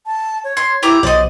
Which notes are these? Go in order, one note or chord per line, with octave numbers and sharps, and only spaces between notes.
A5
C#5
C6 G#6
E4 G4 A#5 D6
B1 F#3 C5 D5 D#5